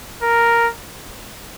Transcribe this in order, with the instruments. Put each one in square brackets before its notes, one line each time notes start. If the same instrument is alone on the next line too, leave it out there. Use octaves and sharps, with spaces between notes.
[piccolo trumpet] A#4